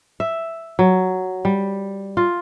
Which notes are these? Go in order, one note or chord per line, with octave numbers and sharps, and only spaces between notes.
E5
F#3
G3
F4